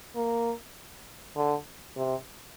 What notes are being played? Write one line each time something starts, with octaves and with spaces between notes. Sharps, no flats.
A#3
D3
C3